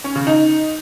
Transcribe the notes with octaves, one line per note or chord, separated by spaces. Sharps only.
C#4
C#3
D#4